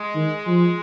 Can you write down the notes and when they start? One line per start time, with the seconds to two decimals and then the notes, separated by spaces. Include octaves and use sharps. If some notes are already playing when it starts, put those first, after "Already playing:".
Already playing: G#3
0.16 D#3
0.47 F3